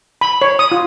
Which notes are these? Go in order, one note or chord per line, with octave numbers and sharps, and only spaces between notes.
B5
C#5
D#6
F4